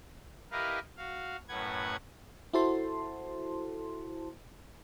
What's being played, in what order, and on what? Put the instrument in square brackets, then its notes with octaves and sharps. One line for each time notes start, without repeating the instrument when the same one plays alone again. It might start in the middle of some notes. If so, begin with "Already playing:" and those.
[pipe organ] E4 G4 A#4 B4 D#5 F5
F#4 F5
F#2 A2 B4 F#5 G#6
[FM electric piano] E4 F#4 A4 C5 A5 C6